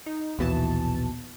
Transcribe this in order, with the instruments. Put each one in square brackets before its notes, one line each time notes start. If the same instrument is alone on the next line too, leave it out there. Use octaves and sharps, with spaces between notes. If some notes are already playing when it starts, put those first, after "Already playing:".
[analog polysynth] D#4
[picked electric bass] A#1 B2 [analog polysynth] D#2 E3 A5